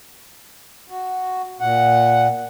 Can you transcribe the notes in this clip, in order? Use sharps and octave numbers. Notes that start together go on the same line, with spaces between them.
F#4
A#2 F#5